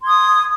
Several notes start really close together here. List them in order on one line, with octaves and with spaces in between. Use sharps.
C6 G#6 D#6